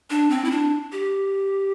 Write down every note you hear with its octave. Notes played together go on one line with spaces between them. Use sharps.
D4
C4
E4
D4
G4